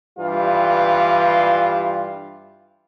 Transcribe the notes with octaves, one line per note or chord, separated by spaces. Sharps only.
G2 E3 G3 F4